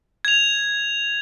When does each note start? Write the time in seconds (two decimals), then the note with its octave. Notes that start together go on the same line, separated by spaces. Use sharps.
0.25 G#6 F7